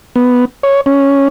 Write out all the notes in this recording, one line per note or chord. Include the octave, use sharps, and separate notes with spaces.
B3
C#5
C#4